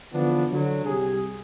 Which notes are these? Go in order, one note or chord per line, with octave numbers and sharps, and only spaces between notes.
D3 E3 F3 B3 D4
D3 F#3
C2 G4 G#4